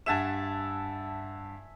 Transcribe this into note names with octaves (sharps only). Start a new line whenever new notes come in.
G2 E5 F#5 G#5 A5 E7